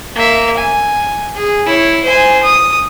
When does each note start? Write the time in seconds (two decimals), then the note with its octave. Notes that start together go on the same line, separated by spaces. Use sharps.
0.15 A#3 E5
0.57 G#5
1.35 G#4
1.66 E4 C#5
2.04 C5 G#5
2.43 D#6